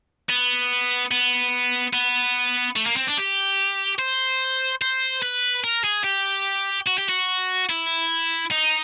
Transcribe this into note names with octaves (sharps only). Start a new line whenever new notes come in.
B3
B3
B3
A3
A#3
C4
D4
G4
C5
C5
B4
A#4
G#4
G4
F#4
G4
F#4
E4
D#4